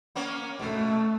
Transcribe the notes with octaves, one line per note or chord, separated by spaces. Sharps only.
A#3 B3 C#4
B2 A3